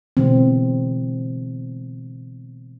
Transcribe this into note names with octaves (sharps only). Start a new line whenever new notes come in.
B2 D3 E3 G#3 C4